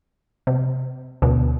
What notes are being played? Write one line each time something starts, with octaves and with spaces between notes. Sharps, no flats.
C3
D2 B2